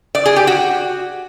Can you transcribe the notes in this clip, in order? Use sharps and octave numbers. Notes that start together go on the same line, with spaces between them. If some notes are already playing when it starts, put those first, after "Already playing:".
D5
G#4
G4
F#4